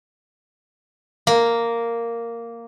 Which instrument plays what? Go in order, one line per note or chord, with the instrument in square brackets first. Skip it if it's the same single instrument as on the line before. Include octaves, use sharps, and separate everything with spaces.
[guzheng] A#3